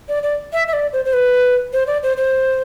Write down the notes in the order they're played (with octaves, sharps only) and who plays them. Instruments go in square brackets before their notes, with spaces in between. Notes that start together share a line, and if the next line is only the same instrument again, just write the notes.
[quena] D5
D5
E5
E5
D5
C5
C5
B4
C5
D5
C5
C5